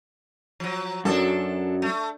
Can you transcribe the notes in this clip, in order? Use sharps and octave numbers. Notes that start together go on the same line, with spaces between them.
F3 F#3
F#2 F#3 D4 A4
A3